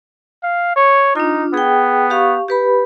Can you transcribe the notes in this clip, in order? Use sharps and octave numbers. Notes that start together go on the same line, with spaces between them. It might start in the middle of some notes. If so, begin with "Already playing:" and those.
F5
C#5
D4 D#4 F4
B3 G#4 G5
G4 F5 C#6
G4 B4 B5